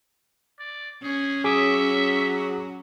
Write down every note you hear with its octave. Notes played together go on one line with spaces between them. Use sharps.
D5
C#4 G#4
F#3 G#4 E5 D6 D#6